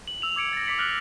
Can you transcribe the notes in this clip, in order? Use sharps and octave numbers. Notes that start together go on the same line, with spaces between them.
F#7
E6 F7
D6 G#6 C#7 D7
A6 A#6
D6 B6 C#7 F#7
F6 F#6 A6 A#6 F7 F#7